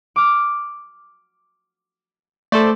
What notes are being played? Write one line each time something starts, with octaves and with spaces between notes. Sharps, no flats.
D6 F6
A3 A4 C5 D5